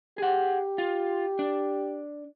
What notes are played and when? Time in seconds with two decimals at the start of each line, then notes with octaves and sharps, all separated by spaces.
0.18 G4 G#4 F#5
0.78 F4
1.39 D4